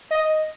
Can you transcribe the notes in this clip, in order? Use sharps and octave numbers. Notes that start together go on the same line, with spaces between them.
D#5